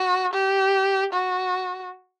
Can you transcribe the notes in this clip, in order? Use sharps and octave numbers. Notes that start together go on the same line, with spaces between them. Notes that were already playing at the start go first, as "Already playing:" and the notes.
Already playing: F#4
G4
F#4